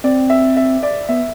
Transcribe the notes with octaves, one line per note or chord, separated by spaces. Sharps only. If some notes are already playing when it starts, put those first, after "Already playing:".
C4 D5
E5
E5
D5
B3 E5